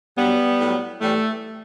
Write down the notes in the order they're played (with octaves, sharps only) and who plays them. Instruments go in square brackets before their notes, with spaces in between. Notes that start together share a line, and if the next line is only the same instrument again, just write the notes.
[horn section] G2 F#3 G3 B3
A2 F#3
A2 E3 G3 A3